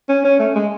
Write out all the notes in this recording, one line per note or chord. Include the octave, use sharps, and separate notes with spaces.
C#4
C#4
A3
G#3